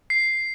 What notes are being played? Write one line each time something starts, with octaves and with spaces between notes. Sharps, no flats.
C7